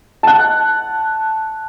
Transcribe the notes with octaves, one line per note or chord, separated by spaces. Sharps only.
F#5 A5